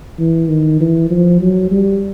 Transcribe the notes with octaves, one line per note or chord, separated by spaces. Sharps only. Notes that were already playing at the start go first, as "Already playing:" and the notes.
E3
D#3
E3
F3
F#3
G3